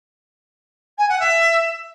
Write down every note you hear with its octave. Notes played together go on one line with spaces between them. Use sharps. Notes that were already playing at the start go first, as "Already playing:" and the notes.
G#5
F#5
E5